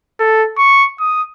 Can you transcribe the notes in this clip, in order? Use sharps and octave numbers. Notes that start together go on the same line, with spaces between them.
A4
C#6
D#6